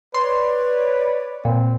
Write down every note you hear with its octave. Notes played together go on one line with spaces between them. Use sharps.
B4 C#5 D5 C6
A#2 C4